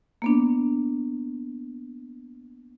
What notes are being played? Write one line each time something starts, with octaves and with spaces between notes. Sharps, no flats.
A#3 B3 D4